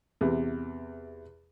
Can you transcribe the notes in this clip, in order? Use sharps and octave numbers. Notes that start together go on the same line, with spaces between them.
E2 C3